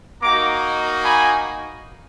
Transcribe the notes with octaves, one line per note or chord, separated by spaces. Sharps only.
A#3 D#4 F#4 A#5 D6
G#5 B5